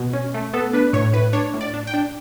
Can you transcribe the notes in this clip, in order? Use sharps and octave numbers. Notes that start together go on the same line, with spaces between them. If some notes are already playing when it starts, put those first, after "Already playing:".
Already playing: B2
C#4
A3
B3 A4
D4 B4
A2 C#5
A2 B4
D4 C#5
A2
D5
D4
G5
D4